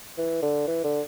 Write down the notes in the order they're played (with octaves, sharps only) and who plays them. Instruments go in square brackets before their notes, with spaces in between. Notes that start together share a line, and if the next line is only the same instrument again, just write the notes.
[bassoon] E3
D3
E3
D3